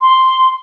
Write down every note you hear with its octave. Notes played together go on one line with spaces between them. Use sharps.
C6